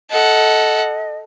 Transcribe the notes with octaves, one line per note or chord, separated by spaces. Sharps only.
A4 D#5 F#5